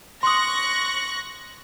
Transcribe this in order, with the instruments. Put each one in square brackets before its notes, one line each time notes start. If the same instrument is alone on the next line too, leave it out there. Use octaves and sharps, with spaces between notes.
[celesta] C6 D#6 [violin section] C#6 F#6 A#6